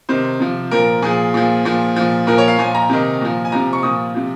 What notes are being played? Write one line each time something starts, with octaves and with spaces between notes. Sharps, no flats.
C3 D#3 C5
C3 F3
A#2 F3 A#4
A#2 F3 G#4
A#2 F3
A#2 F3
A#2 F3
A#2 F3 A#4
C#5
F5
A#2 F3 G#5
A#5
C3 D#3
A#2 F3
G#5
C3 F3 A#5
C#6
A#2 F3 D#6
C3 F3